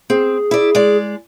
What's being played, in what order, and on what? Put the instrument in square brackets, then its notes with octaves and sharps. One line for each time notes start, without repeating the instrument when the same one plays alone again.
[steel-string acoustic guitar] C4 [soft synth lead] G#4
[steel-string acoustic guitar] E4 D5
G#3 D5